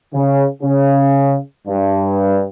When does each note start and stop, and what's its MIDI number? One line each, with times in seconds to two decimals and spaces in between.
0.14 0.44 49
0.63 1.36 49
1.68 2.43 43